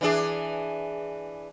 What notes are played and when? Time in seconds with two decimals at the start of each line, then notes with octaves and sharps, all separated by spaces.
0.01 E3 D4 G#4